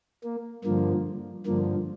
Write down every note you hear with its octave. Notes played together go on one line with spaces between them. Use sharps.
A#3
G2 D3 F3 A#3
G2 D3 F3 A#3